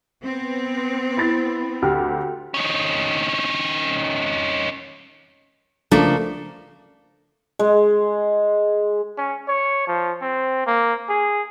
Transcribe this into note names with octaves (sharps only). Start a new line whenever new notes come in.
B3 C4
E4 A6
D2 G4 F6
D#3 C#4
C#3 F3 A3 A#3 D4
G#3
C#4
C#5
F3
C4
A#3
G#4